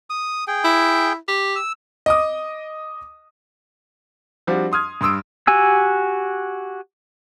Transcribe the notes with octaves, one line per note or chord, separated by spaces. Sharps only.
D#6
G#4 G5
E4
G4
E6
D#5 D6 D#6
F3 G3 C4 D4 F#4
C6 D#6 F6 G#6
G2 C6 D#6 E6 D7
F#4 G4 G#5 E6